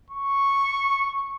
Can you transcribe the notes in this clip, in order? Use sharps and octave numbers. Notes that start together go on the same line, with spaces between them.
C#6